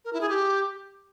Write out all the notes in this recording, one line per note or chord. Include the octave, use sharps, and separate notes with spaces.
A#4
E4
G#4
G4